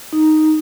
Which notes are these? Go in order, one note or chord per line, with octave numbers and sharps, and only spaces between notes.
D#4